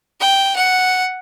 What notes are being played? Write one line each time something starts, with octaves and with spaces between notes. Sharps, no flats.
G5
F#5